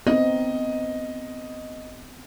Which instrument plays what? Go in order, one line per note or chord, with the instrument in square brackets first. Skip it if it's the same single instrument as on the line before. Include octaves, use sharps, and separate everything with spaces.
[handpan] B3 C4 D#4 [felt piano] D#5